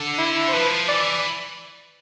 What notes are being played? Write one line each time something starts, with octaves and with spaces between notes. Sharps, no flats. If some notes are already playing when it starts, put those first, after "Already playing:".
Already playing: D3
E4
C5
F3 B4
E3 D5